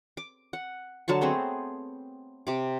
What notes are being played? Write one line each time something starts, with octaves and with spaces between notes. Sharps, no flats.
D6
F#5
D3 F#3 A5 C#6
A3 B3 C4 G#4
C3 D6